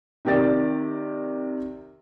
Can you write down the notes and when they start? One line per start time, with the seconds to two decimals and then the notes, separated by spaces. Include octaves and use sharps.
0.25 C3 D#3 G4 A#4 D5 A6